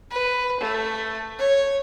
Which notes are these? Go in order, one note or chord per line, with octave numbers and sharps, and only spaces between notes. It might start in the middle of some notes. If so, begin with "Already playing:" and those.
B4
A3
C#5